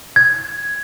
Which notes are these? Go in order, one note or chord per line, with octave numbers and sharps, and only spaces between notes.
G#6